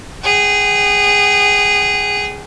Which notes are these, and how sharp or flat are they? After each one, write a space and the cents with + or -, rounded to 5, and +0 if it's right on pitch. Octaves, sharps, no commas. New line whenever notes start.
G#4 -15 G5 -45